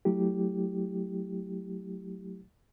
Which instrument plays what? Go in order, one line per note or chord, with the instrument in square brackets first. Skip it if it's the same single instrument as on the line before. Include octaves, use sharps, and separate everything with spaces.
[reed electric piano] F#3 A3 E4 G4